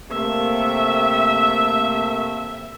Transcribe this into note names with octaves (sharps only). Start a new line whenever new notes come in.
C3 A3 A#3 E5